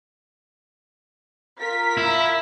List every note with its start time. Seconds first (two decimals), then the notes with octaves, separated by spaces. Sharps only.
1.59 F4 A#4 B6
1.97 E4